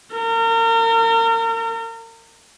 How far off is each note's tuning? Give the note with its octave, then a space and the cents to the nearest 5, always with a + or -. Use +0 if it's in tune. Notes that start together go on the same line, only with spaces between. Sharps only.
A#4 -35